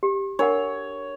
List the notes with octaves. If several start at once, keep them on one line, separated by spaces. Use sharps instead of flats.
G4
D4 A#4 C#5 F#5